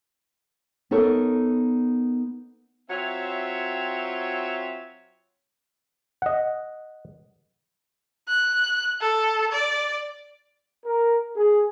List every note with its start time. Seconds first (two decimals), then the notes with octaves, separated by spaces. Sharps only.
0.91 B3 D#4 A4 A#4 C#5
2.90 F#3 C4 F4 C#5 E5
6.22 D#5 F#5
8.28 F#6
9.01 A4
9.52 D5
10.85 A#4
11.36 G#4